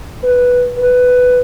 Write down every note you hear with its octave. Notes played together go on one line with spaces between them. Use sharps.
B4
B4